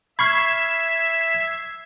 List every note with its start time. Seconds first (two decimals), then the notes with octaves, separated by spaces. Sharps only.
0.19 E5 B5 C#6 F6 G#6 C7